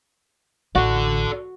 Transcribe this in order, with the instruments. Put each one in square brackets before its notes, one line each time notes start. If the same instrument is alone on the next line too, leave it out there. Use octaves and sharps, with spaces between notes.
[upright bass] A1 [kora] F#4 [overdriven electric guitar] A4 D5